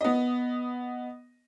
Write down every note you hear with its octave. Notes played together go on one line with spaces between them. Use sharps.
B3 D#5